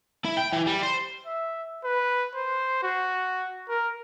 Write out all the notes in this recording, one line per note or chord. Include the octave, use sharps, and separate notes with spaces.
E4
G5
E3
G3
C5
E5
B4
C5
F#4
A#4